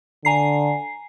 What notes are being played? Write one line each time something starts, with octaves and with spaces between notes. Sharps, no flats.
D3 G#5 A#5 C7